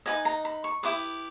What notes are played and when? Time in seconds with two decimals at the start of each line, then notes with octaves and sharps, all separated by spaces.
0.06 D#4 G4 B4 D#5 G#5
0.25 A#5
0.45 B5
0.64 C#6
0.83 E4 G4 B4 D#6